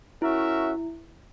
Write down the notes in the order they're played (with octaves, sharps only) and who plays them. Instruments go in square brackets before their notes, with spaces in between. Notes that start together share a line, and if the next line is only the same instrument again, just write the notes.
[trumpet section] C#4 F#4 A#4 E5 [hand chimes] E4